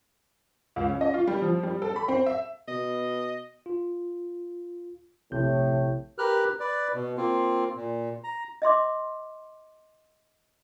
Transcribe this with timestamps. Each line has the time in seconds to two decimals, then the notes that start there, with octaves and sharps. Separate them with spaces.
0.76 C#2
0.89 C#4
1.01 D#5
1.14 F4
1.27 G3
1.42 F3
1.63 G3
1.82 A4
1.96 B5
2.08 C4
2.26 E5
2.68 B2 D#5
3.66 F4
5.32 A#1 A2 C3 G6
6.18 G4 A#4 B4 F6 F#6
6.60 B4 D5
6.94 B2
7.17 A#3 C4 F4
7.76 A#2
8.24 A#5
8.62 D#5 E5 C6 D6